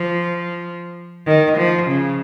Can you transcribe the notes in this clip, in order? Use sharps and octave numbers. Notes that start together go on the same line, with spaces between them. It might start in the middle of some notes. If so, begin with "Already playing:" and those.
Already playing: F3
D#3
F3
C#3